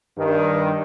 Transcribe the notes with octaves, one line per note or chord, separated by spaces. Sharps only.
G2 D#3